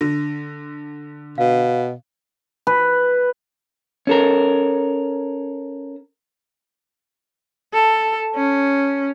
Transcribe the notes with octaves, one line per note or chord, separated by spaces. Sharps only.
D3 A#6
B2 F5
B4
C#4 A4 A#4
A4
C#4